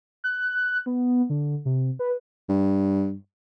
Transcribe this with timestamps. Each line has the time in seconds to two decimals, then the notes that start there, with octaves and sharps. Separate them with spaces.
0.24 F#6
0.86 B3
1.30 D3
1.65 C3
1.99 B4
2.49 G2